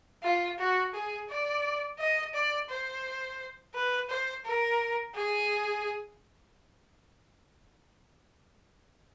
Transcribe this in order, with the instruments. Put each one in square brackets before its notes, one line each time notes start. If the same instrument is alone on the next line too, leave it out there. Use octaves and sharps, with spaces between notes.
[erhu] F4
F#4
G#4
D5
D#5
D5
C5
B4
C5
A#4
G#4